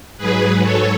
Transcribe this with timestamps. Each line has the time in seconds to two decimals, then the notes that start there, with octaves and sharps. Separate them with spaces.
0.17 G#2 F#3 G#4 B4
0.63 A4 C#5